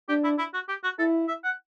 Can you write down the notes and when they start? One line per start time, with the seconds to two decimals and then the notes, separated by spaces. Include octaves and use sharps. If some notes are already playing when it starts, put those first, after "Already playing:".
0.08 D4 G4
0.24 E4
0.38 E4
0.54 F#4
0.68 G4
0.84 F#4
0.98 E4 A4
1.28 E5
1.44 F#5